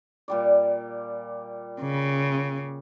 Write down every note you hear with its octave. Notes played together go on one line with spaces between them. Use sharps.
A#2 G3 D5
C#3